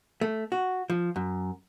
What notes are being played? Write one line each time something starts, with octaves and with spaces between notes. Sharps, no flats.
A3
F#4
F3
F#2